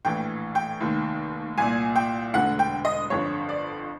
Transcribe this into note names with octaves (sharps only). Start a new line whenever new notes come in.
A#1 A2 E3 G5
G5
F1 D#2 D#3
C2 A#2 G#5
G5
E1 D2 D3 F#5
G5
D#5
G1 F2 D3 C#5
D5